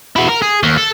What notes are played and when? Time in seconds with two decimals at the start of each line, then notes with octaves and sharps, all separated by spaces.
0.16 E4 F#4
0.28 A#4
0.42 G#4
0.63 D#2
0.77 A4